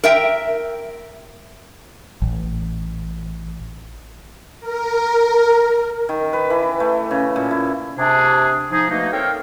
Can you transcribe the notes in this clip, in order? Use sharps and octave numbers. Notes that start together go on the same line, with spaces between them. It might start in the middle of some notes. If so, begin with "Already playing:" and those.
A#4 E5 G5
A1
A#4
D#3
B4
E3
A3
C#3
A#2
E4
C3 D4 G#4
F3 D#4 G#4
B2 A3 A#3 D#4
C4 A4 A#4 C#5 F5 G5